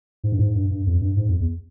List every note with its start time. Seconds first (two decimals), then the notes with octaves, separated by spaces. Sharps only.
0.24 G#2
0.32 G2
0.39 G#2
0.55 G2
0.71 G2
0.87 F2
1.01 G2
1.17 G#2
1.28 F2
1.40 E2